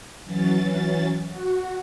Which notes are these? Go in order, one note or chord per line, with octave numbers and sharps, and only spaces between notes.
E3 F#3 C#4 A6
F#4